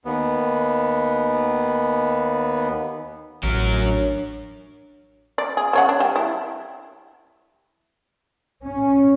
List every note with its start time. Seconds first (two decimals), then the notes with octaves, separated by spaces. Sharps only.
0.05 D#2 B3
3.43 A1 F#3 A#4
3.76 D4 C#5
5.38 D5
5.57 G#4
5.73 C#3 C#5 F#5
5.89 D4
6.00 G3
6.16 E4
8.62 C#4